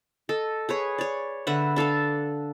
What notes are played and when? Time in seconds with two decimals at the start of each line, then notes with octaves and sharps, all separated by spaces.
0.29 A4 D#5
0.69 G#4 B4 C#5
0.98 C#5 D5
1.47 D3 B4 E5 F#5
1.76 D4 A4 F5 A5